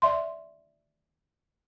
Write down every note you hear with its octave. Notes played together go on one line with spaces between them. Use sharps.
D5 E5 C6